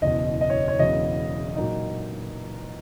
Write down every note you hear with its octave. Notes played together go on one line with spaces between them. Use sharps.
F#1 E2 B2 D#5
D#5
C#5
C#5
E1 E2 C#3 F#3 D#5
A#2 F#3 A#3 D#4